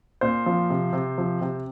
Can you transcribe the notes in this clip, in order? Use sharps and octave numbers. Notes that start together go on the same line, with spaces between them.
A#2 C5
F3
C3
C3
F3
C3